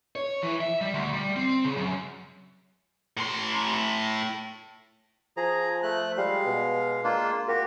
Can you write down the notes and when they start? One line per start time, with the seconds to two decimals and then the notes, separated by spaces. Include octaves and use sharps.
0.16 C#5
0.43 E3
0.61 E5
0.81 G3
0.94 D2
1.13 G3
1.36 C4
1.65 C#3
1.77 F#2
3.17 A2 C6
5.37 F3 G#4 A#5
5.83 A3 F#6
6.18 G3 G#3 F5
6.46 B2
7.04 G#3 A#3 D4 F4
7.48 A#3 F#4 G4